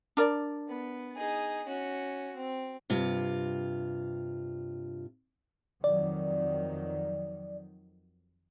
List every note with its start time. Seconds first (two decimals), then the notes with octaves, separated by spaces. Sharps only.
0.17 D4 A#4 D5
0.69 B3
1.17 D#4 G#4
1.67 C#4 F#4
2.36 C4
2.90 G2 C3 F4
5.84 F2 D#3 F#3 D5